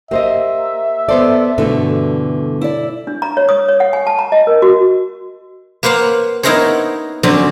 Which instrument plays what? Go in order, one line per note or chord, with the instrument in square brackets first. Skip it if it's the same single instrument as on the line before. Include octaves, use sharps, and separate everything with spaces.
[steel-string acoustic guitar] A#3 [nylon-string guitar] G4 C5 D#5 [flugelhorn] E5
[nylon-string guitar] B3 C5 D5 [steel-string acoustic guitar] A4
[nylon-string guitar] G2 B2 D3 [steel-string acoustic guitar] E3 A3
[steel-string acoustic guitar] E4 D5
[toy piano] D4
A#5
C#5
D#6
C#5
F#5
G#5
A5
A#5
D#5
A#4
F#4
[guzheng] A#3 B4 C5 F5 F#5
B3 D#4 E4 A#4 C5 C#5
D3 F#3 C4 C#4 G4